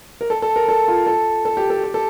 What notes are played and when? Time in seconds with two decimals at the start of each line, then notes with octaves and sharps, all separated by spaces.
0.21 A#4
0.30 A4
0.42 A4
0.56 A#4
0.69 A4
0.88 F4
1.07 A4
1.45 A4
1.57 G4
1.70 A4
1.84 G4
1.94 A4